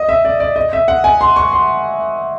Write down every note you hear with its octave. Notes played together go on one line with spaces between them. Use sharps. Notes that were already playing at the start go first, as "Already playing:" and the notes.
Already playing: D#5
E5
D5
D5
D#5
E5
F#5
G#5
C6
C#6
C6